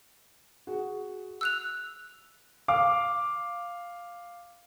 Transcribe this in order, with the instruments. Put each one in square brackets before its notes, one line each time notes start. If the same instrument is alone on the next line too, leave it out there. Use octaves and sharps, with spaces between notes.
[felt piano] F#4 G#4
[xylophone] E6 F#6 F7
[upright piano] F5 D6